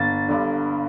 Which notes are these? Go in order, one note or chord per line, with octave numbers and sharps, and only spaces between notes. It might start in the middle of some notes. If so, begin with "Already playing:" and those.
Already playing: G1 A6
G2 D3